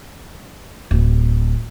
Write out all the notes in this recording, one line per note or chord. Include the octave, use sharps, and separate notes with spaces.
D1